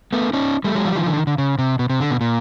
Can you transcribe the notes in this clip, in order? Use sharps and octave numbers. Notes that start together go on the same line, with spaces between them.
A3 B3
C#4 D#4
G3 A3
F#3 G#3
F3 G3
D#3 F3
D3 E3
D#3
D3
C#3
C3
B2
C3
D3
B2
A#2